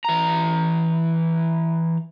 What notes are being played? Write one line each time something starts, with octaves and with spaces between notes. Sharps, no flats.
E3 A#5